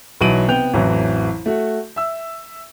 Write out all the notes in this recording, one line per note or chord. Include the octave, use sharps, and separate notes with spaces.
B1 E3 F#3 D7 D#7 F#7
C3 B3 G5 G6 F7
A1 F2 E3 F#3
A3 F#4
E5 E6